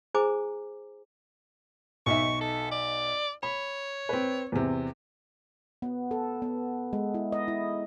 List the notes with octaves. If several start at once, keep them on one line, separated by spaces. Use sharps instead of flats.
E4 G#4 C5 G#5 A#5 D6
B1 D#4 E5 C#6
A4
D5
C#5 B5
C4 B4
E2 C3
B3
A4
B3
G#3
E4
D#5
E4